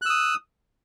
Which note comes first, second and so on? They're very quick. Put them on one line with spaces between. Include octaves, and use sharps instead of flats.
F#6 E6 D#6